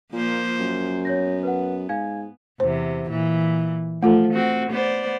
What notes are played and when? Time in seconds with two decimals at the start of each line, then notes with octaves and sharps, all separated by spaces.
0.13 A#2 F3 A#3 C5
0.60 F#2
1.05 B3 C#5 G6 A#6
1.43 B4 F#5
1.89 G#2 F5 G#5 G#6
2.60 E2 C3 C5
3.10 A#2 E3
4.03 F3 A3 F4 A4
4.33 C4 F#4
4.71 B3 C5 D5